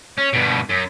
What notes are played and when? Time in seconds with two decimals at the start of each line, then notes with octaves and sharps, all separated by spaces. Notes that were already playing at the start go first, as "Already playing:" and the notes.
0.18 C#4
0.33 G2 B2
0.69 F#2